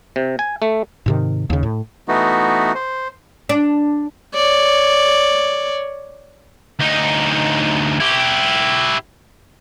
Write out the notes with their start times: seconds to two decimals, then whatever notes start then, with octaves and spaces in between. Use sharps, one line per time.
0.16 C3
0.39 G#5
0.62 A3
1.06 G#2 C3 D#3
1.50 D#2 C#3
1.63 A2
2.08 E3 A3 B3 D#4 F#4
2.75 C5
3.49 D4
4.34 C#5 D5
6.79 D2 D#4
8.00 E4 G4